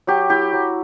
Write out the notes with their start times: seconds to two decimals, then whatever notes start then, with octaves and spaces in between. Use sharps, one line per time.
0.07 F#3 G4
0.30 E4 G4
0.53 F#3